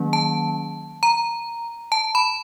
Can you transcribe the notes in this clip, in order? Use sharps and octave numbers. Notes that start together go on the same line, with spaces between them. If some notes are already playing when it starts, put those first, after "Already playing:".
Already playing: D#3 F#3 A#3 C#4
A5
A#5
A5
B5